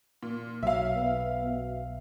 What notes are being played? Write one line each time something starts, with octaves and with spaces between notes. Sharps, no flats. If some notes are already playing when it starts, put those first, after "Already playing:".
A#2
B1 F#3 E5 F5
B3
B2